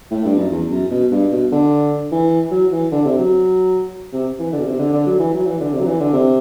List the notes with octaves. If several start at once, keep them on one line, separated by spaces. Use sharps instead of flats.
A2
G2
F#2
E2
F#2
B2
G2
B2
D3
E3
F#3
E3
D3
C3
F#3
C3
E3
D3
B2
C3
D3
D3
F#3
E3
F#3
E3
D3
C3
F#3
E3
D3
C3